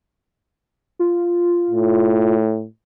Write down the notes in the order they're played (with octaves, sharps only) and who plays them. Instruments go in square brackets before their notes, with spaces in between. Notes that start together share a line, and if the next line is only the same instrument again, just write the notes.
[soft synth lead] F4
[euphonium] A2